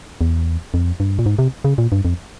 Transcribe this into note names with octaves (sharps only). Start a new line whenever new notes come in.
E2
F2
G2
A#2
G#2
C3
C#3
A#2
G2
F2